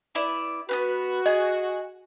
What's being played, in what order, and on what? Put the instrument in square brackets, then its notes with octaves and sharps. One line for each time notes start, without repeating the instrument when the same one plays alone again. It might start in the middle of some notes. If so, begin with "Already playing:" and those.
[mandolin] B3 E4 D5
[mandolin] B3 C#4 B4 [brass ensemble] F#4
[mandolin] G#4 [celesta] D#5